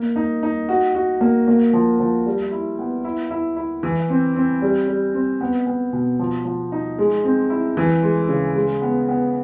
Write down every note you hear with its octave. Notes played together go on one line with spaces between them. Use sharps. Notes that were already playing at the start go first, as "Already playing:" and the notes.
Already playing: A#3
D#4
D#4
F#4
F#4
A#3
A#3
F3
F3
G3
E4
B3
E4
E4
E4
E3
C4
C4
G3
G3
C4
B3
B3
B2
F3
F3
D#4
G#3
C4
E4
E3
G#3
C#3
G#3
B3
B3